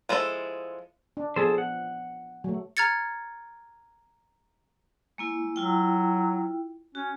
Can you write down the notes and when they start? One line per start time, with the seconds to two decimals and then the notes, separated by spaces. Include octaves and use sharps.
0.09 F3 G#3 E4 F4 A4
1.17 D4
1.36 F3 B3 G#4 A4 C5
1.58 F#5
2.44 F#3 A3
2.77 A#5 F6 G#6 A6 C#7
5.18 G#3 A#3 E4
5.56 F#3 E4 F4 G5
6.95 C#4 F#4